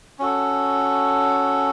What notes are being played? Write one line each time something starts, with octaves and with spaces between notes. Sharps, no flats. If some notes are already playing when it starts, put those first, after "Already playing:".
C#4 F#4 A4